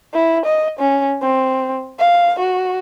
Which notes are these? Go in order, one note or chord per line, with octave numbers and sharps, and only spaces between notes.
E4
D#5
C#4
C4
F5
F#4